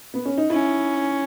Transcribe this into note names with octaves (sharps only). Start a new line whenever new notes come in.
B3
C#4
D#4
C#4 E4